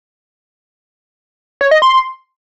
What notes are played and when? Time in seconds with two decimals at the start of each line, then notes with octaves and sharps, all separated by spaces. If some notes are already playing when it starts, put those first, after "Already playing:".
1.61 C#5
1.71 D#5
1.82 C6